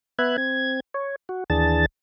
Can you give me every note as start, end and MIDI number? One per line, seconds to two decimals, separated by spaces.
0.19 0.37 59
0.19 0.37 71
0.19 0.37 76
0.19 0.37 90
0.19 0.37 92
0.38 0.80 60
0.38 0.80 92
0.94 1.16 73
1.29 1.44 66
1.50 1.86 39
1.50 1.86 52
1.50 1.86 62
1.50 1.86 68
1.50 1.86 81
1.50 1.86 93